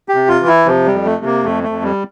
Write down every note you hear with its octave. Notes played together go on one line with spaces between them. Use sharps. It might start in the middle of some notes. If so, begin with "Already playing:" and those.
G4
C3
F4
E3
E4
C3 F3
G3
F2
A3
C3
A#3
F2 A3
A3
F2
G3